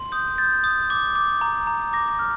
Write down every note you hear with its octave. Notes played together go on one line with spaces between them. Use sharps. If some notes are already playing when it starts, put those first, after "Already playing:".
Already playing: C6
D#6 G6
G6 A6
D#6
D6
D6
A#5
A#5
D6 A#6
F6